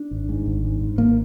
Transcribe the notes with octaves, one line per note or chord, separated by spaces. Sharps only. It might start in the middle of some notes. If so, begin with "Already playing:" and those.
Already playing: D4
G#1
G#2
G#1
G#2
G#2
G#1 A#3